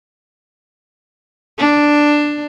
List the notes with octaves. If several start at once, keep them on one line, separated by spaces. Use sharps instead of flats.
D4